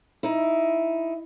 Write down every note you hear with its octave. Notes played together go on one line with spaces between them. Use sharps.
D#4 E4